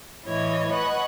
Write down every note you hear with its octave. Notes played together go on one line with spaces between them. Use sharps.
A2 E3 C#5 D#5 G#6
B4 D#5 F#5 G#5 C#6